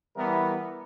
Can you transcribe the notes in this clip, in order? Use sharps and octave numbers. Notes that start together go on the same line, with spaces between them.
E3 G3 B3 E4 A#4